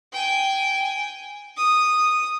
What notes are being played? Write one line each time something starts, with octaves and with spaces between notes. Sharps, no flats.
G5 G#5
D#6